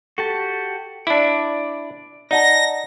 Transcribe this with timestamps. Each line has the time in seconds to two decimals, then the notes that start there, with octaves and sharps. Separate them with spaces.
0.18 F#4 G4 A4 A5
1.07 D4 E4 D5
2.31 D#4 D5 F#5 A5 A#6